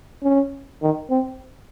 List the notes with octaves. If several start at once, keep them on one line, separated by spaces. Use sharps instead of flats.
C#4
D#3
C4